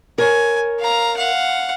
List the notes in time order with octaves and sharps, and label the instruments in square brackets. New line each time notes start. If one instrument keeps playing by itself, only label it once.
[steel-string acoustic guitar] A#4 C#5 [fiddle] G#5
[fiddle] F5 A#5
F5 F#5